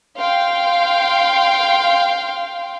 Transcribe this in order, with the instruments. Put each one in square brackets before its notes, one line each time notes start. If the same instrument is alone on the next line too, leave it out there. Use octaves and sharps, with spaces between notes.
[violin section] F5 G5 C6